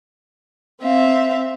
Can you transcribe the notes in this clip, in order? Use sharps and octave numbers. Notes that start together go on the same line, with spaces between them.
C4 E5 F5